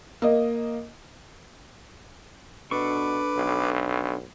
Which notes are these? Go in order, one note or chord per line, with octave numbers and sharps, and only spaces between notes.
A#3 D#5
B2 D4 A4 B4 C#6 D6
B1